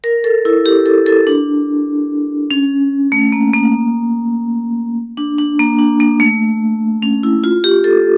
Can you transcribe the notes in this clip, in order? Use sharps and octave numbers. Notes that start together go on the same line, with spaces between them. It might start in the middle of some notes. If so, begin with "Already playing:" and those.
A#4
A4
E4
G4
A4
A4
D4
C#4
A3
A#3
A#3
D4
D4
A#3
D4
A#3
A3
C#4
E4
F4
G4
A4